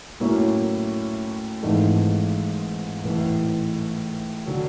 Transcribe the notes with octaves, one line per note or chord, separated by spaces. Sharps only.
A2 F#3 A#3 C#4 E4
G#1 G#2 E3 A3
A1 A2 E3 A3
D3 F#3